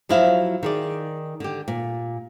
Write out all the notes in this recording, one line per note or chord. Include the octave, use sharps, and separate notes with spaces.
F3 F#3 E4 E5 F5
D#3 G#4 D5
D3 G4
A#2